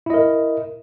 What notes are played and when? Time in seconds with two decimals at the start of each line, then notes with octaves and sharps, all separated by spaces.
0.06 E4
0.10 D#5
0.14 A#4